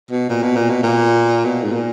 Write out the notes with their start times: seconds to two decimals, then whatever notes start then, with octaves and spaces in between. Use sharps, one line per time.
0.11 B2
0.29 A#2
0.42 B2
0.56 A#2
0.69 B2
0.83 A#2
1.44 B2
1.64 G#2
1.72 A#2